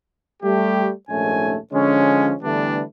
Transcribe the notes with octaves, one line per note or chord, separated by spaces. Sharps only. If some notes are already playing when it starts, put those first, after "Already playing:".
G3 A3 G4
A#1 D#2 G#2 A3 C#4 G#5
D3 F3 G#3 C#4
D3 E3 G3 A3 B3 D4